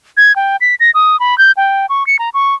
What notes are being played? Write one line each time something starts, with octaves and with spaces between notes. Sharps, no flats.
G#6
G5
B6
A#6
D#6
B5
G6
G5
C#6
C#7
A#5
C#6